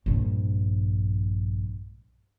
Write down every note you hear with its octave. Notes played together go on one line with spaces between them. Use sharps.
A#1 G2